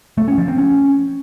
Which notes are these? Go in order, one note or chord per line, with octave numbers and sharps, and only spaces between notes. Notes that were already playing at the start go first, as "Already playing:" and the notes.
A3
C#4
F3
C4
C#4